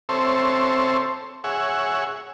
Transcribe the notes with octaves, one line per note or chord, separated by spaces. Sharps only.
C4 A4 C5 C#5 E5
G#4 C#5 E5 F#5